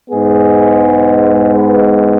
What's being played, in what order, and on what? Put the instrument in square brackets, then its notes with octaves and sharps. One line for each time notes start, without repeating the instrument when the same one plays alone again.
[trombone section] G#2 G#3 B3 G#4
B4